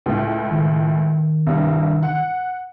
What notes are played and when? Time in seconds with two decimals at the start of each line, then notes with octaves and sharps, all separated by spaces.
0.06 C#2 A2
0.51 D#3
1.47 C2 G2
2.03 F#5